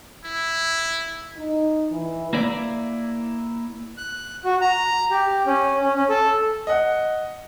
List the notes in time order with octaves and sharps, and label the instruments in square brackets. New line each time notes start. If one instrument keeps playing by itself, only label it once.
[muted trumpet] E4
[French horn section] D#4
E3
[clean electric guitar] A#3 E4 D5
[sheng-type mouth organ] F#6
F#4
A#5
G4
C#4
C#4
C#4
A4
[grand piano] D#5 F#5